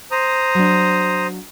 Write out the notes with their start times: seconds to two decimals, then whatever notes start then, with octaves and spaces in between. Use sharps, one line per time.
0.11 C5 A#5 D#6
0.55 F#3 D4